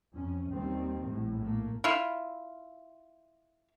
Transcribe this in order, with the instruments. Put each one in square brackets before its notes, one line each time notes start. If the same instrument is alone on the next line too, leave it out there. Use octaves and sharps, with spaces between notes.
[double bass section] F2 C#4
D#2 D#3 G3 C4
A#1 A2
A3 A#3
[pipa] E4 F4